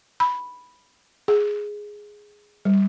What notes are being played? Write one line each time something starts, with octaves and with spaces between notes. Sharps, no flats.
B5
G#4
G3